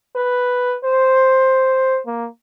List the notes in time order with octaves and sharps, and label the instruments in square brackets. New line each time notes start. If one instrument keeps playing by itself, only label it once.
[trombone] B4
C5
A#3